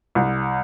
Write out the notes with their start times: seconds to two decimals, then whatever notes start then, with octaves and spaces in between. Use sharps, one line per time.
0.15 C2